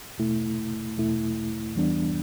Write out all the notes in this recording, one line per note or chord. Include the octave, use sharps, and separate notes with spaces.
E2 B2 A3 E4
E2 B2 A3 E4
E2 E3 G3 B3 D4